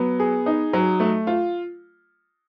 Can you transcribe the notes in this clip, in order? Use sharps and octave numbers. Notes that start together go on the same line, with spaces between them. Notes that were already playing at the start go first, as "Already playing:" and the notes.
Already playing: F#3 B3
G#4
D#4
F#3
A3
F4